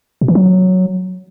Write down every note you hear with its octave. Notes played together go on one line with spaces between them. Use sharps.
B2
E3
F#3